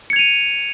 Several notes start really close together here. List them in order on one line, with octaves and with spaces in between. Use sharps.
C#7 G#6 F7 D#7